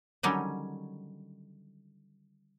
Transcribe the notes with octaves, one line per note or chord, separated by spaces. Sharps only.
D3 D#3 F#3 G3 C#4